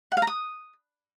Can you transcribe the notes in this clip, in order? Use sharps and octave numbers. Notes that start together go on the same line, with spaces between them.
F#5
F5
A#5
D#6